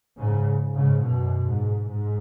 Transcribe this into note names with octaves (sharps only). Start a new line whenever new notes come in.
G#2 C#3
G#2 C#3
F#2 B2
G#2
G#2